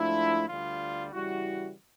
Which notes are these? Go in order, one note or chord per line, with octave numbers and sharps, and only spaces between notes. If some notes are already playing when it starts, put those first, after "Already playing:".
Already playing: G#2 F3 A3 D4 E4
D2 D3 G3 F4
C#3 E3 G3 E4 F#4